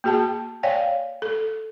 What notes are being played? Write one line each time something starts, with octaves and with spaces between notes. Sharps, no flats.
A#3 F#4 G#4 G5 A5
C#5 D5 F5 G5 G#5
A4